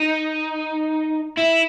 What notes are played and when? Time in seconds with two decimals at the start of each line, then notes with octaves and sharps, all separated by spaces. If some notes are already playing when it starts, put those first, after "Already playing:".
Already playing: D#4
1.37 E4